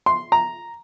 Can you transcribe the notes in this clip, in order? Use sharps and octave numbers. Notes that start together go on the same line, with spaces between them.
C6
A#5